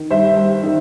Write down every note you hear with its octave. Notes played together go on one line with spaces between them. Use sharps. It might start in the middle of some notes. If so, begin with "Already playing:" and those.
Already playing: D#3
G2 C5 E5
G2
D#3